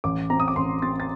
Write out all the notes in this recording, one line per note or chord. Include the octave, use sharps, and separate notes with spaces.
A1 D6
C4 A#5
D#6
D6
A1 C6
C4 A6
A6